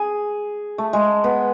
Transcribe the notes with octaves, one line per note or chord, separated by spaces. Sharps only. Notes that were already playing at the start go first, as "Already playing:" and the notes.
Already playing: G#4
A3
G#3
B3